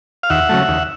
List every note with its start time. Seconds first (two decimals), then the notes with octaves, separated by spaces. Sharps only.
0.23 F5
0.30 D#2 E5 F#5
0.49 C#3 F#3 A3
0.68 D#2